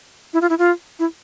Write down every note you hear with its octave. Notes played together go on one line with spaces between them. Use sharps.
E4
F4
E4
F4
E4